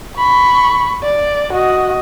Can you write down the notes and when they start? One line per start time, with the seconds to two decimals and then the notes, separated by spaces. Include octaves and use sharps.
0.17 B5 C#6
1.03 D5
1.52 F#4 D#5